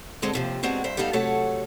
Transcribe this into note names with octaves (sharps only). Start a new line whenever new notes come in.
D3 G#3 C4 A4 D5
D#2 C3 F3
G#3 B3 C4 D4 F#4
G2 C5 E5
G3 B3 D#4 A4 F5
C3 F#3 A3 A4 C#5 F#5